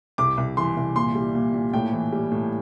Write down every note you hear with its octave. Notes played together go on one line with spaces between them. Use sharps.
C2 D6
C2
E3 C6
C2
A#2 C6
G3
A#2
A#2
A2 G5
E3
G3
A2